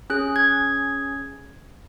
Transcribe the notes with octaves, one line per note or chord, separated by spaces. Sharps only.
C#4 G#4 F#6
G#6